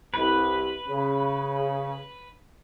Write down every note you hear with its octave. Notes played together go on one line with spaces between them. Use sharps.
C2 B4
C#3